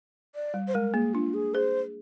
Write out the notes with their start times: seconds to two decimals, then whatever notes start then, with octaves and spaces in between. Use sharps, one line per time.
0.35 D5
0.54 G3
0.68 C5
0.74 G#3 A#4
0.94 A#3 G#4
1.14 D4 F4
1.34 G#4
1.54 G#4 C5